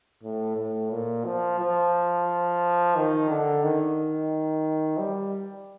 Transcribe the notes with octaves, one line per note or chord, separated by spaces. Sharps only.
A2
A2
A#2
F3
F3
D#3
D3
D#3
G3